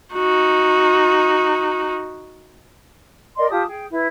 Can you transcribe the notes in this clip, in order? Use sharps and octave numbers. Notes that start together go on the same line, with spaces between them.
D#4 F#4
A#4 D5 D#5 C6
F4 G4 A5 D#6
G#4 G5
E4 B4